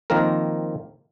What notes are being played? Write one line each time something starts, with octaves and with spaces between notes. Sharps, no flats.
D#3 F3 A#3 C4 A#4